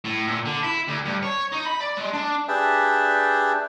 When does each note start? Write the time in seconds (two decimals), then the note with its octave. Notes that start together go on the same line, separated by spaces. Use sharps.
0.05 A2
0.27 A#2
0.45 D3
0.63 E4
0.88 D2
1.05 G2
1.23 C#5
1.52 D#4
1.65 B5
1.80 D5
1.97 G#3
2.13 D4
2.48 D4 G4 G#4 B4 E5 A5